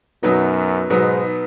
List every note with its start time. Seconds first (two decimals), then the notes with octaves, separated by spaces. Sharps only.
0.23 F#2 B2 F#3 B3 D#4
0.90 G#2 B2 F#3 B3 D#4